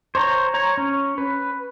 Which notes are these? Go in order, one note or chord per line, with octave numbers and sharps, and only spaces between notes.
C5 C#5 A#5
C#5 A#5
C#4
B4